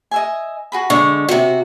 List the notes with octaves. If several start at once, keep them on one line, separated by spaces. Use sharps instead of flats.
D#5 E5 G#5
F#4 G#4 B5
D3 G#3 C#6
C3 F#4 C5